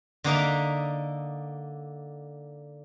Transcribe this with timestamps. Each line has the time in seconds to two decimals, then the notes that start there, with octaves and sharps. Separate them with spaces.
0.24 D3 A#3 D#4 E5